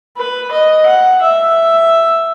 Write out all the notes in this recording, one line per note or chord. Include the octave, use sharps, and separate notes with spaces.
B4
D#5
F#5
E5